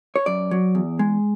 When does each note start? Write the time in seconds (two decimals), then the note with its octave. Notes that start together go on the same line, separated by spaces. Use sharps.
0.16 C#5
0.26 F#2 D5
0.51 F#3
0.75 E2
0.99 G#3